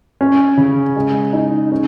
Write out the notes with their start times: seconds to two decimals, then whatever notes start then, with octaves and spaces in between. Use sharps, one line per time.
0.21 C#4
0.57 C#3
0.96 G#3
1.33 D#4
1.72 C#4